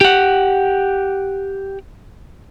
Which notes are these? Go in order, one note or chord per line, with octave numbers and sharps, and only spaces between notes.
G4 F#5